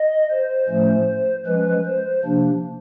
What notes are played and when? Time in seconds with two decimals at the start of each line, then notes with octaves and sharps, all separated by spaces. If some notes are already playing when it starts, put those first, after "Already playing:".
Already playing: D#5
0.30 C5
0.68 A2 F3 A3 C#4
1.46 F3 G#3 C#4 B4
1.85 C5
2.24 C3 F3 A#3 D4